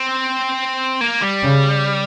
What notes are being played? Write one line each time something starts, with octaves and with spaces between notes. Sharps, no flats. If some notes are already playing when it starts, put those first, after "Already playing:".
Already playing: C4
A#3
G3
C#3